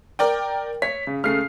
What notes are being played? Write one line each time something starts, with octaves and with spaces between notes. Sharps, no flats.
A#4 D5 G5
C#5 B6
C#3
C#3 A3 F6 C7